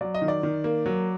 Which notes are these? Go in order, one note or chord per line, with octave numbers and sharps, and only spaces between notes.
F#3 D5
D#5
D#3
D5
D#3
A#3
F#3